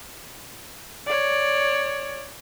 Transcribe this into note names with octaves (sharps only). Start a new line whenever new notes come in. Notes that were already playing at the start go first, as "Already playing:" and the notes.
C#5 D5